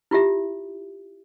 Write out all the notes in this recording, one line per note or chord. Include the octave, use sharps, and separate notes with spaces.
E4 F4 G4 E5